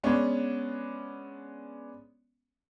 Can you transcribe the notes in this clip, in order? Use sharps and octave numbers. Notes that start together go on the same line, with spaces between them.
G#3 B3 C#4 D4